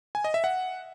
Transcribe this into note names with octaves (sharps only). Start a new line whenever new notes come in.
G#5
D#5
E5
F#5